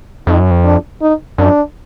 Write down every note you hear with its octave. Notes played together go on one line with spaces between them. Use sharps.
F2 D#4
F#2
F2
D4
D#4
F#2 D4